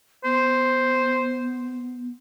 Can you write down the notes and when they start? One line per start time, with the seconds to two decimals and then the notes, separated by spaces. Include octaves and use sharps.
0.24 B3 C5